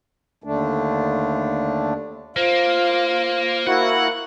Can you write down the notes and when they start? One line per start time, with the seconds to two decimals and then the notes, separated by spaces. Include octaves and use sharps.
0.44 D#2 D3 A3 D4
2.36 A#3 F4 C5
3.67 A#3 E4 F#4 F#5